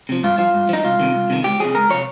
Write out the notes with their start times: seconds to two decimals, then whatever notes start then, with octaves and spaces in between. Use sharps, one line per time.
0.09 C3 F3
0.23 G2 F4
0.38 F3 F4
0.54 G2
0.69 F3 D#4
0.84 C2 F4
0.99 C3 D#3
1.15 C2
1.30 C3 D#3
1.44 C#2 G4
1.60 C3 F3 G#4
1.75 C#2 A#4
1.90 C3 F3 C#5